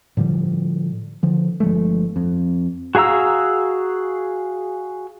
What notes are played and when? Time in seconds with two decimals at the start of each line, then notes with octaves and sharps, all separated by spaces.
0.17 A2 D3 F3 G3
1.23 D3 F3
1.60 G1 F3 G#3 A3
2.16 F2
2.95 F#4 G#4 F5 A#5 E6